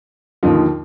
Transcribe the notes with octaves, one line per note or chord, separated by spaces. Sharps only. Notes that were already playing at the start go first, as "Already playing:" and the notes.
D#2 D3 F3 D#4 F4